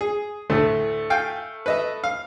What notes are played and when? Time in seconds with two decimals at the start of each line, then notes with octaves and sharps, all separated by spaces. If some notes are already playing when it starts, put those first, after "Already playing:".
0.01 G#4
0.50 D2 A2 A3
1.10 F5 G5 G#5
1.66 B4 D#5 E5
2.04 F5